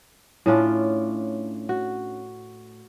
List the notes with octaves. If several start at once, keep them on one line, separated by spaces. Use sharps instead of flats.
A2 C#4 D4 F4
F#4